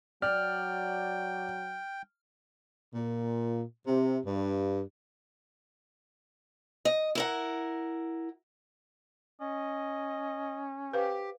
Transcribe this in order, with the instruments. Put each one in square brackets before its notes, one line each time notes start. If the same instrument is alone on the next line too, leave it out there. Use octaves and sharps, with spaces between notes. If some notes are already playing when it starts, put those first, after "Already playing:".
[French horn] F#3 [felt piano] D5 [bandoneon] G5 [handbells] F6
[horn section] A#2
C3
G2
[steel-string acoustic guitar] D#5
E4 A#4 F#5
[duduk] C#4 [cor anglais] D#5
[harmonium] G4 [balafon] B4 C5 F5